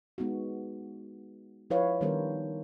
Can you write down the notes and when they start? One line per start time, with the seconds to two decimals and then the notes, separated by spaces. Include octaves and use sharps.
0.18 G#3 B3 D#4 F#4
1.70 F3 E4 F4 B4 C#5 F5
2.01 D#3 G3 B3 D4 A#4 C5